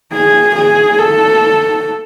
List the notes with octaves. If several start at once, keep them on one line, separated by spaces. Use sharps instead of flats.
G#4
G#4
A4